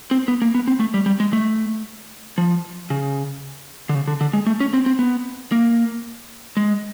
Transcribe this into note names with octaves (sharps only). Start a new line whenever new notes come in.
C4
B3
A#3
B3
C4
A3
G3
G3
G#3
A3
F3
C#3
D3
C#3
D3
D3
G#3
A3
C#4
C4
C4
B3
A#3
G#3